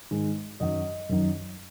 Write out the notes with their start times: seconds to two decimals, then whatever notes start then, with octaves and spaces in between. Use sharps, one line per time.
0.11 G#2 D#3 G#3
0.60 F#2 D#3 F#3 D#5
1.09 F#2 D#3 F#3